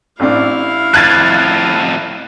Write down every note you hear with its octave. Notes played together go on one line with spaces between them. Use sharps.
A1 C4 D4 E4 F5
F2 A2 F#6 G#6 A6